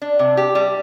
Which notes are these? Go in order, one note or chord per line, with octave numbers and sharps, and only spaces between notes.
D4
C3
G4
G3